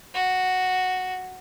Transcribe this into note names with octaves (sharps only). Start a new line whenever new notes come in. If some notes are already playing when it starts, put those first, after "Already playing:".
F#4